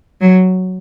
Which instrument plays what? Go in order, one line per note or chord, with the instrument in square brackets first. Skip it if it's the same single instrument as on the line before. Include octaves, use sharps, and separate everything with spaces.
[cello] F#3